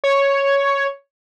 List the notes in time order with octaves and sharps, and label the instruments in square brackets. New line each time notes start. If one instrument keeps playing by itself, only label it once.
[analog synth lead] C#5